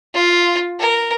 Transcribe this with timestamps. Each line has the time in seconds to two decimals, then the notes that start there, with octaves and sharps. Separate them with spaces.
0.14 F4
0.79 A#4